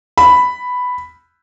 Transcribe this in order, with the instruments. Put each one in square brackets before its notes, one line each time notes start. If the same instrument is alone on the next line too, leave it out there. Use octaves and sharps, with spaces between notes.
[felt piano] B5